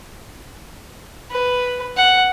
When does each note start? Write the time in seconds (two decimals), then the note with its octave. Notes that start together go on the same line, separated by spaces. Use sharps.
1.31 B4
1.97 F#5